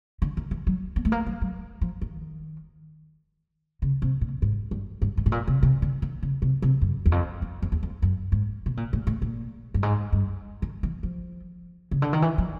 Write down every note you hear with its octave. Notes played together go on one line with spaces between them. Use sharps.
D3
D#3
E3
F#3
B3
A3
A#3
F#3
F#3
F3
D#3
C#3
C3
A#2
G#2
G2
G2
G#2
A2
A#2
C3
C3
D3
D#3
C#3
C3
C3
F#2
E2
F2
F2
F2
E2
F2
F#2
G#2
B2
A#2
A2
A2
A#2
G2
G#2
G2
D#3
E3
F3
C#3
D3
D#3
E3
F3